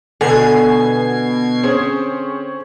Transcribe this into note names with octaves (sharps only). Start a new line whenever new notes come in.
B2 D3 G#5 G#6 C7
C4 C#4 G#4